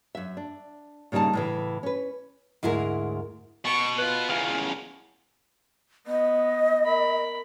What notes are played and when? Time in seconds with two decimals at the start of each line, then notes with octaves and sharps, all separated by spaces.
0.15 F#2 E5
0.37 D4
1.12 A#2 C#3 G3 D#4 A5
1.33 A2 C#3 E3
1.83 C#4 B4
2.63 D2 G#2 E4 G#4 A#4
3.65 B2 C#6
3.98 F4 B4
4.30 E2 C#3 F5
6.07 B3 D#5
6.84 A#4 B5